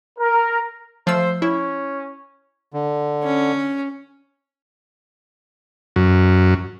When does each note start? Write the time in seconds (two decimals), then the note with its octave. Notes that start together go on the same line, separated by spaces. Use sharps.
0.19 A#4
1.07 F3 A3 C5 E6
1.42 C#4 E4
2.74 D3
3.23 C#4
5.96 F#2